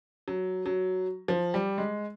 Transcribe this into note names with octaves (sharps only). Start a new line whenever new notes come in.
F#3
F#3
F3
G3
G#3